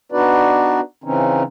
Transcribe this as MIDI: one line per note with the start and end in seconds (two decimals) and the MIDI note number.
0.12 0.80 59
0.12 0.80 62
0.12 0.80 63
0.12 0.80 66
0.12 0.80 71
0.12 0.80 74
1.04 1.43 49
1.04 1.43 52
1.04 1.43 60
1.04 1.43 61
1.04 1.43 63